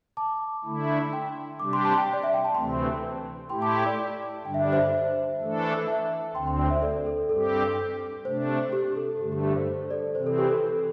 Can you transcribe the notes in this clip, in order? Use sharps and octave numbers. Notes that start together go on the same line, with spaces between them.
A5 D6
D3 A3 E4
G5 C6
C3 G3 D4 G4 D6
C6
A5
G5 C6
D5
E5
G5
A5
D2 C3 E3 A3 C4 G5 C6
A2 A3 E4 G4 G5 C6
A5 D6
G5 C6
D5 G5
G2 D3 G3 D4 G5
E5
D5
C5 E5
E3 A3 D4 A4
E5 A5
D2 D3 C4 G5 C6
G5 C6
D5 G5
C5 E5
A4 D5
A4
G2 G3 C4 G4 A4
C3 A3 D4 C5
G4
A4
G2 D3 A3 G4
G4
G4
C5
C5
A4 D5
C3 E3 C4 C5
A4
G4
A4